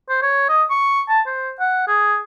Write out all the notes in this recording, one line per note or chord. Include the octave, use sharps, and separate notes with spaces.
C5
C#5
D#5
C#6
A5
C5
F#5
G#4